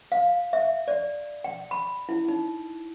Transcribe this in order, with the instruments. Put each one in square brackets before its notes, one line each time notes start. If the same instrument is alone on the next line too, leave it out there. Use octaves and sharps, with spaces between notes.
[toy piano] F5
E5
D5
G5
B5
E4
D#4